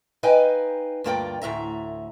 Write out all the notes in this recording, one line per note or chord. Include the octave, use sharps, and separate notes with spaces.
D#4 B4 D#5 F5 G5 G#5
D2 G2 A#3 F4 D5 G5
D2 A2 E5 A#5